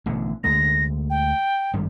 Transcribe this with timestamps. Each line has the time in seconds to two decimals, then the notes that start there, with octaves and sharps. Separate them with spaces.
0.06 A1 B2 D3
0.44 D2 D3 G#3 A#6
1.10 G5
1.74 G#1 G2 G3